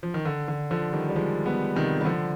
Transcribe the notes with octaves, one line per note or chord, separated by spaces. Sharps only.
F3
D#3
D3
D3
D3 F3
D#3 G3
G3
F3 G#3
G3 B3
C3 D#3
G3
D3 F3